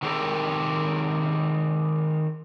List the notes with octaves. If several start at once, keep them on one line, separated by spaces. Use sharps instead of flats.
D#3 F#3 C4 G4 A4 A#4